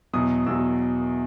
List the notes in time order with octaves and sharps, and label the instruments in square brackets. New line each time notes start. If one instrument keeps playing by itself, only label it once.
[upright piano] E2 B2 F#3 D#6
E2 B2 F#3 E6